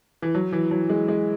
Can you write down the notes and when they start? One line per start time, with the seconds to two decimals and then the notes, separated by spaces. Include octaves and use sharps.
0.22 E3
0.35 F#3
0.52 E3
0.71 F#3
0.90 G#3
1.08 G#3